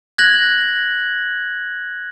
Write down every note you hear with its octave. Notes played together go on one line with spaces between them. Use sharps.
F#6 G#6 A#6 F#7